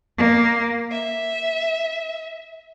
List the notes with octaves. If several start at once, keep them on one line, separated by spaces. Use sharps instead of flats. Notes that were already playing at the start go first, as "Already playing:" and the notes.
A#3
E5